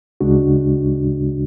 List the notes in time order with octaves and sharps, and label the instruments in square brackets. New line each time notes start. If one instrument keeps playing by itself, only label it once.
[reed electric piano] D2 C#3 G#3 D4 F#4